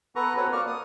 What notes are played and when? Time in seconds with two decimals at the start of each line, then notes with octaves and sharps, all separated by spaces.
0.16 B3 A4 B4 A#5 C#6
0.36 B3 C4 F#4 A4 B4 C#5
0.52 A#3 D5 C#6 F6
0.67 D#6